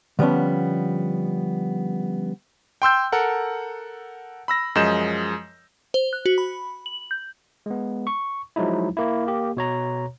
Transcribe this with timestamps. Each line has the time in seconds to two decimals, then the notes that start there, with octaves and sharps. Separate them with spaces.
0.19 D3 F3 G3 B3 C#4
2.82 G5 C6 E6 G6
3.12 A4 A#4 F#5
4.48 B5 E6 A#6
4.75 F#2 F3 G#3 D#5 G6 E7
5.94 C5
6.13 F#6
6.26 F#4
6.38 B5
6.86 F#7
7.11 G6
7.66 G#3 B3
8.07 C#6
8.56 F3 F#3 G#3 D#4 E4
8.97 A#3 E4
9.26 A#3 G4
9.57 B2 C#5 A#5